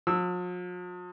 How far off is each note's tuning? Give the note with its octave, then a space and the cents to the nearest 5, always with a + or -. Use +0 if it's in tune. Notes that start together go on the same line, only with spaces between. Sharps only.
F3 +45 E6 -5